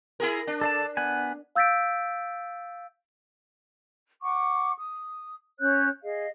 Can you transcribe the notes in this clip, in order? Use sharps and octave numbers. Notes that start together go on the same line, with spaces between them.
E4 G#4 A#4
D4
A4 D5 A5
B3 F#5 G#5
F5 E6 G6 A6 B6 D7
F#5 C#6 D6
D#6
C#4 C#5 F#6 G6
G#4 D#5 F5